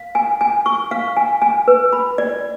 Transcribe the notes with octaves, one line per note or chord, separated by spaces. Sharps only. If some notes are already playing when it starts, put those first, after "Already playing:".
Already playing: F5
G#5
G#5
C#6
F5
G#5
G#5
B4
B5
D5